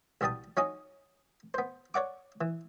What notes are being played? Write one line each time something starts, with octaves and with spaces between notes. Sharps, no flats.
C2 B2 G3 A5 D#6
F#3 C#4 D#4 G#5 D#6
B3 C5
C#5 D5 F#5 D6
E3